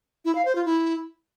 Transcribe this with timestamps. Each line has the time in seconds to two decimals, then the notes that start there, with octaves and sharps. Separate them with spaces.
0.25 E4
0.35 F5
0.45 C5
0.55 F4
0.65 E4